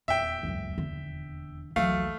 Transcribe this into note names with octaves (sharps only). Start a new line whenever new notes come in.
D#1 E2 A#2 E5 G5
C#2 F#2
D3
A#1 D#2 E3 F#3 A3 F5